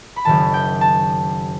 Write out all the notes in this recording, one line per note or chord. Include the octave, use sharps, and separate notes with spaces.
B5
F#1 F#2 D#3 A5
G5
A5